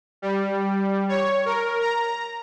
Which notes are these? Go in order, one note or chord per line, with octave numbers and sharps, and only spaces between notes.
G3
C#5
A#4
A#5